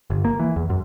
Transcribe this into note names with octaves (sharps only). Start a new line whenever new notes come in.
G1
A#3
E3
E2
F#2